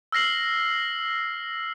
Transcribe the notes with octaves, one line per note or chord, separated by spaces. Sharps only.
E6 F6 A#6 C7 F#7